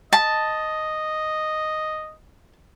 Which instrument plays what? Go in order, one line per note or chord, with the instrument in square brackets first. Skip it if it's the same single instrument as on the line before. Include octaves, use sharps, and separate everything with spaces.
[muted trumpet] D#5 [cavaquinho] A5